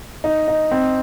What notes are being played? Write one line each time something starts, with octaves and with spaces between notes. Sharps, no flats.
D#4
D#4
C4